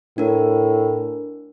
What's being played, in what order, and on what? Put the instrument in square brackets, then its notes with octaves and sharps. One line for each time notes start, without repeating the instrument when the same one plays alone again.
[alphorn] A2 [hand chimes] D4 A#4